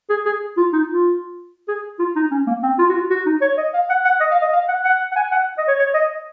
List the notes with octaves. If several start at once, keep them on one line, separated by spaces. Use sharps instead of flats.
G#4
G#4
F4
D#4
F4
G#4
F4
D#4
C#4
A#3
C4
F4
F#4
F4
F#4
D#4
C#5
D#5
F5
F#5
F#5
D#5
F5
D#5
F5
F#5
F#5
F#5
G#5
F#5
D#5
C#5
C#5
D#5